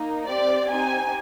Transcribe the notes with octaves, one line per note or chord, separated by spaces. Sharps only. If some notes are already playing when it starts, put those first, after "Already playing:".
Already playing: A#3 D#4
C4 G4 D5
C4 D#4 G4 G#5